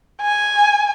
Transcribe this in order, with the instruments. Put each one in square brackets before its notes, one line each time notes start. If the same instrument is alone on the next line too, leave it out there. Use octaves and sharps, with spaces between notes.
[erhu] G#5